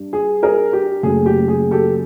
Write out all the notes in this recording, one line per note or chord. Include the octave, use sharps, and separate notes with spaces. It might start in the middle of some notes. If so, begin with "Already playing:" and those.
Already playing: G2 G3
G#4
G#4 A#4
G4
F#1 F#2 C#3 F#3 A3 G#4
G4
G#4
G4 A4